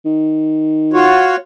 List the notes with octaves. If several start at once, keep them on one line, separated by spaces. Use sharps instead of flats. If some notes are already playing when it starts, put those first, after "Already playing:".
D#3
F4 F#4 C#5